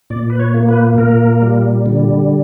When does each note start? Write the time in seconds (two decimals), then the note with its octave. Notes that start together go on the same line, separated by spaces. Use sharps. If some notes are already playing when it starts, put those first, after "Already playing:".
0.10 A#2 D5
0.30 B4
0.39 C#5
0.54 A#3
0.69 B4
0.98 A#2 A#4
1.42 G3
1.86 D3